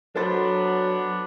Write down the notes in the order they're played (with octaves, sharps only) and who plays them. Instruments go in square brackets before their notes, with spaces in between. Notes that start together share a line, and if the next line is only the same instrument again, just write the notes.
[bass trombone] F#3 [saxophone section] B3 D4 [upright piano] A4 C5 A6